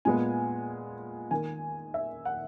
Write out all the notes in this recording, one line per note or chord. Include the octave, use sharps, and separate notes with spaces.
A#2 G#3 B3 G#5
D#3 A#3 G#5
E5
F#5